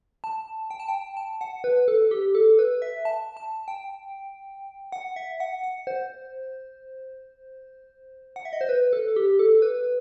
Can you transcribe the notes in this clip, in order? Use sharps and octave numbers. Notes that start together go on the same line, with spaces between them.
A5
G5
A5
G5
A5
F#5
B4
A4
G4
A4
B4
E5
A5
A5
G5
F#5
E5
F#5
F#5
C5
F#5
E5
D#5
C5
B4
A4
G4
A4
B4